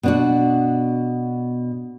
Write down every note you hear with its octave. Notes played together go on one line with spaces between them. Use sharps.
B2 D4 F#4